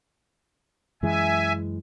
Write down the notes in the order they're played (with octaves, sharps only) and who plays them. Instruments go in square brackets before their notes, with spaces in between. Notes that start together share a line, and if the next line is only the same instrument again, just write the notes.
[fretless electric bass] F#2 E3 G#3 [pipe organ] E5 G#5